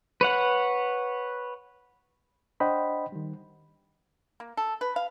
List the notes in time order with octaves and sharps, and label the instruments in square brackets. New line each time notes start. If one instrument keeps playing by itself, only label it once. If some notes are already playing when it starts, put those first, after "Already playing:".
[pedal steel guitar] B4 C#5 F#5
[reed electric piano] D4 C5 D#5 F#5 G5 B5
D#3 G3
[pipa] A#3
A4
B4
F5